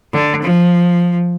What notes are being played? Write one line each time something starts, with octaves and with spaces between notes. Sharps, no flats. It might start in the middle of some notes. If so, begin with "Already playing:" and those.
D3
F3